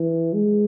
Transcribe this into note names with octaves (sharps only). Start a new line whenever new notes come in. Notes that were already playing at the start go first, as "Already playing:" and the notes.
Already playing: E3
G#3